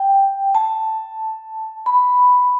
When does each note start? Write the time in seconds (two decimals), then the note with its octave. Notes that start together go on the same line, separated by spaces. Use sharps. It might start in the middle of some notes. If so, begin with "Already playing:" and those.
Already playing: G5
0.55 A5
1.86 B5